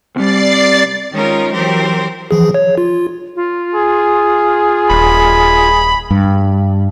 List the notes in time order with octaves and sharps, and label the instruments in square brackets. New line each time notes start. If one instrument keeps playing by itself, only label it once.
[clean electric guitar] C2 G3 [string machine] D5 A6 C7
[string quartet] D#3 G#3 C#4 D#4 F4 A#4
E3 F#3 C4 G4 A#4 C5
[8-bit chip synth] E3 F3 G#4
C#5
F4
[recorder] F4
[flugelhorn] G#4
[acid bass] D#1 [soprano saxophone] B5
[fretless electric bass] G2